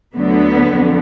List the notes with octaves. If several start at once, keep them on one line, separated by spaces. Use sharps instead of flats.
D2 D3 F#3 B3
F2 D3